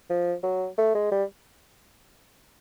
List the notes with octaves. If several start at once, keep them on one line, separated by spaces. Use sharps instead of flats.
F3
F#3
A3
G#3
G3